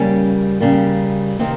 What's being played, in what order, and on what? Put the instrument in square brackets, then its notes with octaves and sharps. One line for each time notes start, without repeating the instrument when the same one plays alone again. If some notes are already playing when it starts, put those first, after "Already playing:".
Already playing: [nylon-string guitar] C#3 G3 A#3 C#4
C#3 G3 A#3
C3 D#3 A#3 C4